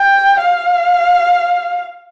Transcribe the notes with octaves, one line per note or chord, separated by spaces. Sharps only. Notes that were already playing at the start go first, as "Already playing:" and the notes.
Already playing: G5
F5